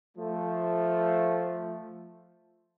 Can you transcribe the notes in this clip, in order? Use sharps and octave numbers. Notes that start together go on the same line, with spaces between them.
F3 A3